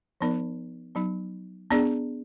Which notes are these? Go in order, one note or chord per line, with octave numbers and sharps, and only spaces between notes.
F3 B3 D#4 A#4 D5
F#3 B3 D#4
B3 D4 G#4 D5